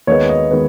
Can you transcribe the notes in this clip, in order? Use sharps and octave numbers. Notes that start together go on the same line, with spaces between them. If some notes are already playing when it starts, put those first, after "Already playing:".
D#2 D#3 G#3 B3 C#5
D#5
D#3 G#3 B3